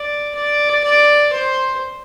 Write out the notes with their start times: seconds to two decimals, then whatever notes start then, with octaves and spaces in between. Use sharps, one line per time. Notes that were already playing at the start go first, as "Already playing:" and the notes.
Already playing: D5
0.35 D5
0.84 D5
1.32 C5